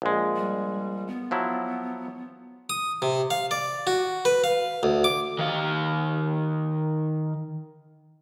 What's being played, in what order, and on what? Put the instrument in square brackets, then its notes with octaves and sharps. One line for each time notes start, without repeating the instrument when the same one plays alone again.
[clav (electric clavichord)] A#1 G#3
[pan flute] G3
B3
[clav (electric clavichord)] F3 F#3 E4
[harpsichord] D#6
C3
F5
D5
F#4
B4
F5
D2
D6
[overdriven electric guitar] D#3 F5